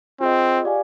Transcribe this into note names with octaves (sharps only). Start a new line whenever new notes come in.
C4 F4 G#4 D#5
G4 D5 F5 G#5